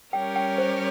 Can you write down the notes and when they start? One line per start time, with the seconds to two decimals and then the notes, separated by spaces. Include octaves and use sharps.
0.13 G3 C#4 G4 A#4 C#5 G5
0.36 G5
0.58 C5